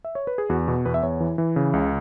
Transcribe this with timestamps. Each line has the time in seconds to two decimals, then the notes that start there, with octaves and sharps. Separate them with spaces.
0.05 E5
0.15 C#5
0.27 B4
0.38 G#4
0.50 E2 F#4
0.68 B2
0.86 E2 B4
0.94 E5
1.03 E2 C#5
1.20 E3
1.38 E3
1.56 C#3
1.73 C#2